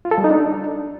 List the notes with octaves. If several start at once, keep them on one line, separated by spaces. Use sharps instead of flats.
F4
A4
G3
D#4
D4